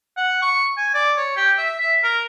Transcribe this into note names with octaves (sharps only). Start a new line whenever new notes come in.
F#5
C#6
G#5
D5
C#5
G4
E5
E5
A#4